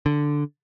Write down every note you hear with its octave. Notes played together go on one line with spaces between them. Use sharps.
D3